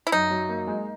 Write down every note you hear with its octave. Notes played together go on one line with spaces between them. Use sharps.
E4
F#2 D#4
F#3
A#3
G#3